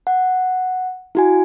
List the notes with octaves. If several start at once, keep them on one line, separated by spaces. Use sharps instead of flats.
F#5
E4 F#4 G#5